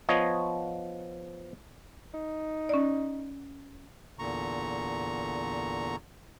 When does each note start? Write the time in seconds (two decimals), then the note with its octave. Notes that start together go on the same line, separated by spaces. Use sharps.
0.09 F3 B3 C#5 D#5
2.14 D#4
2.69 C#4 D5
4.19 E2 A#2 D3 A#5 C#6